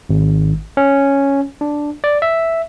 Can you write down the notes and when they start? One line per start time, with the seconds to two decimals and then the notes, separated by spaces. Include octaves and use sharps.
0.09 G#1
0.77 C#4
1.61 D4
2.04 D5
2.22 E5